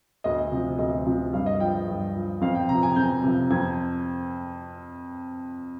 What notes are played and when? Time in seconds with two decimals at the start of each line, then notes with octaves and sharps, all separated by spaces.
0.24 D2 D#5
0.52 C3 F3
0.79 D2 D#5
1.06 C3 F3
1.33 G2 F5
1.46 D#5
1.60 F3 G5
1.88 G2
2.15 F3
2.41 F2 F5
2.55 G5
2.69 C3 F3 A#5
2.83 G#5
2.96 F2 G6
3.23 C3 F3
3.50 F2 G#6